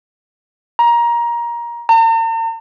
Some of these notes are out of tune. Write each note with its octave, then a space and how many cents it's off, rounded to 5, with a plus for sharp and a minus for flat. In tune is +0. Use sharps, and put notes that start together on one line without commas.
A#5 +20
A#5 -45